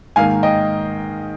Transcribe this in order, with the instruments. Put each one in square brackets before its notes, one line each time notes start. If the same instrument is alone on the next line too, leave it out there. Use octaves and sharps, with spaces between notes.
[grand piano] G#2 D#3 A#3 F5 G#5
D#5 G5